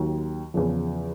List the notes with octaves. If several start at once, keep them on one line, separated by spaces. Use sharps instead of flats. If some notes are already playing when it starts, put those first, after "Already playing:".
Already playing: D#2 D#3 F#3
E2 C#3 F3